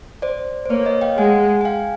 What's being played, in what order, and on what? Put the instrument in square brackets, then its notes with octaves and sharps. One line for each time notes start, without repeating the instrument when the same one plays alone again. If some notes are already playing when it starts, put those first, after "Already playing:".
[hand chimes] C5 D5
C5
[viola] A#3 [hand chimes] B4 C#5
[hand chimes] C#5 D#5
F5 G5
[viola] G#3 [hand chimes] F#5 G#5
[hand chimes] G#5
F5 G5